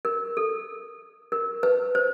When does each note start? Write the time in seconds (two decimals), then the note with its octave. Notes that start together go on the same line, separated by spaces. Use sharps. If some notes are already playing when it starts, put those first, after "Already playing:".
0.05 A#4
0.37 A4
1.32 A#4
1.63 B4
1.95 C5